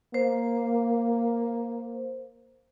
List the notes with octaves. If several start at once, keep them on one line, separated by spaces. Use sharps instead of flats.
A#3 C5